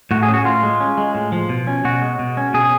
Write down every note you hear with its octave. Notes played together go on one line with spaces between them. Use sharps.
A2 F#4
G#4
C#4
F#4
A2 F4
G#3
C#4
G#3
A2
F3
B2
C#4
B2 F#4
G#3
B2
C#4
B2 G#4